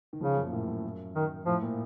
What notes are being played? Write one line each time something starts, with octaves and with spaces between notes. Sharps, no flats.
D#3
C#3 F3
F#2
A#2
A2
F#2
D#3
A2 F3
A#2